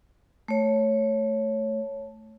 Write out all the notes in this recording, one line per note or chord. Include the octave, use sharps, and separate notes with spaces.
A3 C#5